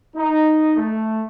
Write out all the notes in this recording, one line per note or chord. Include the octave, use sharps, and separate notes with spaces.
D#4
A3